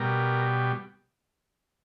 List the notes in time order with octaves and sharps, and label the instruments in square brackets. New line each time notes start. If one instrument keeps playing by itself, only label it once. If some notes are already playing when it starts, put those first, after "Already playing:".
Already playing: [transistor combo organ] B2 G3 A#4